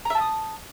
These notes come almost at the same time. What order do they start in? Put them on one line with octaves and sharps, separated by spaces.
A#5 E5 A5 D#6